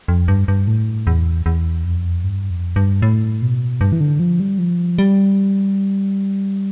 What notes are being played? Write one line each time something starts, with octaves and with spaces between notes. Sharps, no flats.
F2
G2
G2
A2
E2
E2
F2
G2
F2
G2
A2
B2
G2
E3
D3
F3
G3
F3
G3